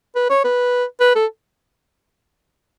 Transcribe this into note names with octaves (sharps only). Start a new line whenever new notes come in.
B4
C#5
B4
B4
A4